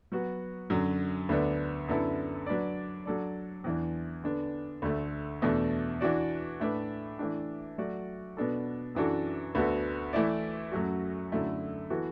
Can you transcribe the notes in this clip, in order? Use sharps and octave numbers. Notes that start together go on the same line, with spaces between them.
F#3 B3 F#4
F#2 D3 F#3
D2 D3 B3 D4
F#2 D3 B3 E4 A4
F#3 D4 B4 D5
F#3 D4 A4 D5
E2 E3 D4
D3 B3 D4
D2 D3 A3
E2 B2 A3 D4 A4
E3 D4 F#4 D5
A2 A3 D4 B4 D5
E3 A3 D4
F#3 A3 F#4 D5
B2 B3 D4 A4
F#2 E3 D4 F#4 A4
D2 D3 B3 F#4 A4
E3 A3 E4 D5
F#2 F#3 A3 F#4
F#2 D3 F#3 A3 E4
E3 B3 F#4 A4